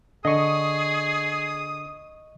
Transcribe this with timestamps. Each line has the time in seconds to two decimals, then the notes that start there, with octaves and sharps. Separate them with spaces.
0.25 D3 G#4 D#5 C#6 D#6